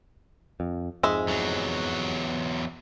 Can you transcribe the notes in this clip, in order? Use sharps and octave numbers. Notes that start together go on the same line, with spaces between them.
F2
F2 G#2 G#3 E5
E2 F#3